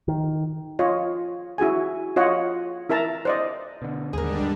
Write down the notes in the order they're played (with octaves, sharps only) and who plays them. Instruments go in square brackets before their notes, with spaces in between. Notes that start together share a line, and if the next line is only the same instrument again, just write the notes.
[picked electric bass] D#3
[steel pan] F4 C#5 D#5
E4 F#4 G#4 G#5
F4 C#5 D#5 F#5
E4 A#4 E5 A5 A#5
C5 D5 D#5
[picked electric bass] B2 D3
[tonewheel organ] D#2 [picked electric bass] G#2 [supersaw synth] D3 G3 D4 [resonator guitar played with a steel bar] G#4 A#4